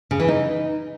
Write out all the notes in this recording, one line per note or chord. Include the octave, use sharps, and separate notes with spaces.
C#3
E3
D#4